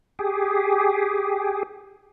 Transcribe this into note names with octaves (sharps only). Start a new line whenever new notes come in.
G4 G#4